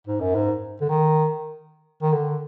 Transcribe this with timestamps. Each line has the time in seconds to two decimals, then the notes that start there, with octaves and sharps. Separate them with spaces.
0.07 G#2
0.21 F#2
0.35 G#2
0.81 D3
0.89 D#3
2.02 D#3
2.12 D3